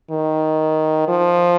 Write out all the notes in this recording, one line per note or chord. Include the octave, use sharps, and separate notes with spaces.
D#3
F3